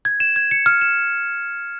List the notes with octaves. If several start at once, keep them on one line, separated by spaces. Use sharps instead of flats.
G#6
E7
G#6
C#7
F6
E7